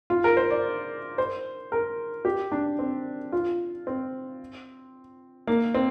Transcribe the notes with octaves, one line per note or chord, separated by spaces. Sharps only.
F4
A#4
C5
D5
C5
A#4
G4
D4
C4
F4
C4
A#3
C4